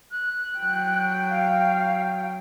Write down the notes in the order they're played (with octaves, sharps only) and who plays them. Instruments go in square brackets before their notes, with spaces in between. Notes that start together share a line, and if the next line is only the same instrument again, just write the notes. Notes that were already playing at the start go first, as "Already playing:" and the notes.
[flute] F#6
[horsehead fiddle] F#3 G5
[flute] F5